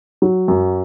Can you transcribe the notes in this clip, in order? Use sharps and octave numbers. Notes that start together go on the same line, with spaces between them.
F#3
F#2